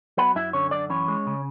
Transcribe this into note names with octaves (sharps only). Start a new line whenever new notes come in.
F#3 B3 B4
F#2 E4 E5
D3 C#4 C#5
F#2 D4 D5
E3 C#4 C#5
G#3
C#3